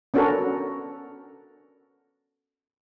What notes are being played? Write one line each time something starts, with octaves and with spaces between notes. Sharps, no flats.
B3 C#4 D4 F#4 A4 A#4